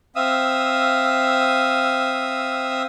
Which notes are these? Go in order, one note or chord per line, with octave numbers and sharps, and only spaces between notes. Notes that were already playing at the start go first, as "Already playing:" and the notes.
C4 E5 F5 D#6 E6